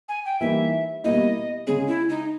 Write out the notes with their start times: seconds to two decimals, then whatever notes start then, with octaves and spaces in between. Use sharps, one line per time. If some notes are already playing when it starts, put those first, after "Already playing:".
0.09 G#5
0.25 G5
0.40 E3 G3 A#3 D#4 E5
1.04 B2 G3 A#3 E4 D#5
1.67 C#3 G#3 C#4 G#4
1.87 E4
2.09 D#4